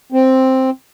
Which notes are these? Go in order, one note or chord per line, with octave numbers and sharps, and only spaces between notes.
C4